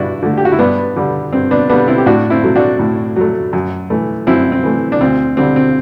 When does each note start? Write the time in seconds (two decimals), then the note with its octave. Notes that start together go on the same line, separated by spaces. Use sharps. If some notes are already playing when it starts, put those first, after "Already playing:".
Already playing: G2 D4 E4 F#4
0.23 D3 A3
0.37 G4
0.45 F#4
0.52 E4
0.59 G2 B3 D4
0.96 D3 G3
1.33 G2 C4
1.51 B3 D4
1.69 D3 G3 B3 D4
1.88 C4 E4
1.98 G4
2.06 A2 D4 F#4
2.30 C4 E4
2.44 F#3 A3
2.56 D4 F#4
2.79 A2
3.16 F#3 A3
3.53 F#2
3.90 E3 A3
4.27 F#2 C4 E4
4.52 C4
4.63 E3 A3
4.92 D4
5.01 D2 C4
5.37 D3 G3 C4
5.56 C4